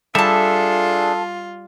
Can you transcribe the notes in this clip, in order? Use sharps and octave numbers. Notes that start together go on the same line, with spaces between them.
G3 D4 F4 G#4 A4 E5 A5